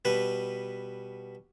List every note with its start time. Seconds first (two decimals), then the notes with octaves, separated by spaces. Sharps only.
0.05 B2 G3 B4